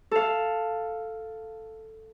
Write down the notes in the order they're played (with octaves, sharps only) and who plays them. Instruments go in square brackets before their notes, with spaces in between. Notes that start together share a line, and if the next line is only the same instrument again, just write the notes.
[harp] A4 F5